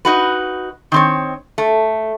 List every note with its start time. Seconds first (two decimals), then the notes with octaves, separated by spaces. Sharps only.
0.05 D#4 F#4 B4
0.92 D#3 C4 C#5
1.58 A3